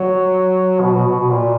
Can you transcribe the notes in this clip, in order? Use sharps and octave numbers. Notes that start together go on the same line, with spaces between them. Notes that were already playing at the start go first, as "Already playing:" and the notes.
Already playing: F#3
B2
B2
B2
B2
A#2